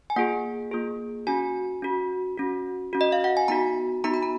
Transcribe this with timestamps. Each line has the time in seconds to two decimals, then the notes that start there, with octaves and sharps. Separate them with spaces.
0.10 G#5
0.16 A#3 F4 G#4 F#5
0.72 A#3 F4 G#4
1.27 C#4 F#4 G#5
1.82 C#4 F#4
2.38 C#4 F#4
2.93 C#4 F#4
3.01 D#5
3.12 F5
3.24 F#5
3.37 G#5
3.48 B3 D#4 F#4 A#5
4.04 B3 D#4 F#4 A#5
4.14 B5
4.23 A#5